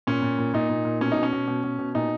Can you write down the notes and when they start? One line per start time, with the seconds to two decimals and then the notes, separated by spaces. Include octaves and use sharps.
0.07 A#2 C#4
0.22 A#2
0.39 A#2
0.54 A#2 D#4
0.69 A#2
0.85 A#2
1.01 B2 C#4
1.12 B2 D#4
1.23 C#4
1.33 B2
1.47 B2
1.63 B2
1.79 B2
1.95 A#2 D#4